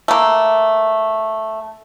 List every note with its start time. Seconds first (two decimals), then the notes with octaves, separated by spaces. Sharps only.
0.08 A3 A#3